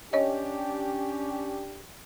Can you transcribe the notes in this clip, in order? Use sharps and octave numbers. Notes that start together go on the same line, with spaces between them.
C#4 D4 G4 C#5 D#5